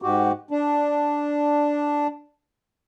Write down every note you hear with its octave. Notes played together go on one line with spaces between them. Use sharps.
G#2 F#4 G4
D4